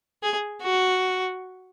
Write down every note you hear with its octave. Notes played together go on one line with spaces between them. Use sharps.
G#4
F#4